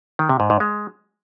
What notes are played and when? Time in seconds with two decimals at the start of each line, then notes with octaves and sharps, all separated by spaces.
0.19 D#3
0.29 C3
0.40 G#2
0.50 G#2
0.60 G#3